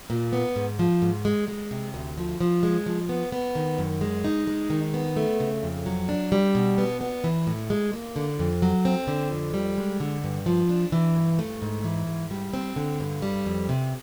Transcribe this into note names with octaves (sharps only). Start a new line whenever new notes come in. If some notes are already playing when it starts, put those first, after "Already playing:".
A#2
B3
G#2
F3
G#2
G#3
G#3
C3
D2
F3
F3
G#3
F3
B3
B3
D#3
F#2
G#3
D#4
G#3
D#3
B3
A3
C#3
F2
F#3
D4
G3
B2
B3
B3
E3
A2
G#3
A#3
D3
F2
F#3
C4
D3
F2
G3
G#3
D3
G2
F3
D4
E3
G2
A3
G#2
E3
G#2
G3
C4
D3
G2
G3
F2
C3